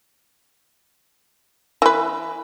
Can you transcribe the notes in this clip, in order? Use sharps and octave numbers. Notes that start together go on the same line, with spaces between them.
E3 B4